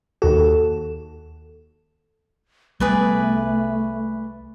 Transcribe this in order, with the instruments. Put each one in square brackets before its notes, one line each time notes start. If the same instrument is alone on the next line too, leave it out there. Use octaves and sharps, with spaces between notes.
[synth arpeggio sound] D#2 F#4 [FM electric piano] A4
[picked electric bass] C2 G3 B3 [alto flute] A3 [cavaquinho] G#4 B4 D5